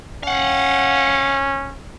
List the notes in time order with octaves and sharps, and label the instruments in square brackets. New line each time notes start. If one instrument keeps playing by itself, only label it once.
[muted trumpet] C#4 [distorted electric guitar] F5 F#5